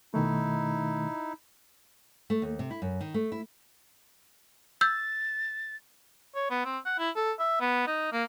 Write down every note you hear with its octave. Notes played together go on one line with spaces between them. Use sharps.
B2 D#3 A3 D#4 E4
A3
D#2
C3
E4
F#2
D#3
A3
E4
E6 G6 A6
C#5
B3
C4
F#5
E4
A4
E5
B3
D#4
A#3